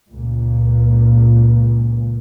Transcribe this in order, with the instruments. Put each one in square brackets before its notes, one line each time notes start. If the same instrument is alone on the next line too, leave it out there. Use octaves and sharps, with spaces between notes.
[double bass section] C#2 A#2